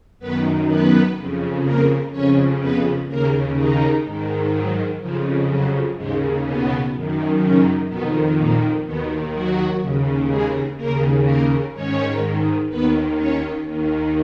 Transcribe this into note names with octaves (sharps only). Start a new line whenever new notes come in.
F#2 D#3 B3 B4
B3 B4
F2 C#3
A#3 A#4
F2 C#3 C#4 C#5
B3 B4
D#2 C#3 A#3 A#4
D#3 D#4
G#2 D#3
F#3
F2 C#3 F3
F#3
D#2 G#2 C#3 G#3
B2 B3
F#2 D#3
C#3 C#4
F2 B2 D#3 B3
A#2 A#3
D#2 B2 D#3 B3
F#3 F#4
D#2 C#3
G#3 G#4
D#2 C#3 A#3 A#4
A#3 A#4
G#2 D#3 C#4 C#5
D#2 D#3 B3 B4
C#4 C#5
D#2 D#3